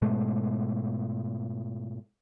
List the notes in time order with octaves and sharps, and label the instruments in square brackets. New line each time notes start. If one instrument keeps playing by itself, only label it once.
[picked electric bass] G#2 B2 G#3 A3